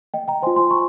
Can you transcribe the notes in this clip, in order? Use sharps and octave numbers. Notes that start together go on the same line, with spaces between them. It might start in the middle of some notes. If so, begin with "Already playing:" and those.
D#5 G5
G5 A#5
F4 C5 G#5 C6
G#5 C6
A#5 C#6